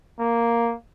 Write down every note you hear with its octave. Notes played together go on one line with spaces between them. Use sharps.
A#3